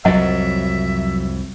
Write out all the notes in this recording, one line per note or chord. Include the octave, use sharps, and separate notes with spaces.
C2 F2 F#3 D#5 E5 F#5